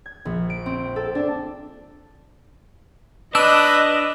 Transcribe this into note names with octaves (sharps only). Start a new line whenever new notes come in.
G#6
A#1
D7
C4
A4
D4
D4 B4 D#5 E6